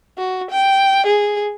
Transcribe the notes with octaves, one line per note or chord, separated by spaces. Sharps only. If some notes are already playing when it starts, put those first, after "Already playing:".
F#4
G5
G#4